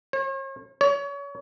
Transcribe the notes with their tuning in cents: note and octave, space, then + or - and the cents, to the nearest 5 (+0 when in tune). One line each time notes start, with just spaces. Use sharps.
C#5 -45
C#5 +30